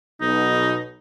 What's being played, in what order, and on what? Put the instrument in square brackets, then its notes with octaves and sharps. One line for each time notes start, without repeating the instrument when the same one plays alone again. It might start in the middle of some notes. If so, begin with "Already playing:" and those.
[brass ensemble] B1 B2 [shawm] D#4